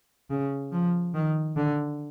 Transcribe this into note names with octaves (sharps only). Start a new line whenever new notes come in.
C#3
F3
D#3
D3